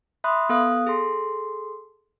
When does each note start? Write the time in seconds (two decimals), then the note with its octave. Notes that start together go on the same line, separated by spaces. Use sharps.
0.24 E5 B5 C6 D#6 F#6
0.49 B3 A4 F5 D#6 F#6
0.87 G#4 A4 C6